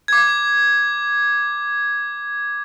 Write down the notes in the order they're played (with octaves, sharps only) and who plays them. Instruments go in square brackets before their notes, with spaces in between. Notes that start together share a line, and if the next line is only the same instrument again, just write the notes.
[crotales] D6 G#6